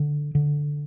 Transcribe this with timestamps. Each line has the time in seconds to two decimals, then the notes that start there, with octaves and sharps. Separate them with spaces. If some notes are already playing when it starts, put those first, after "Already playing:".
Already playing: D3
0.35 D3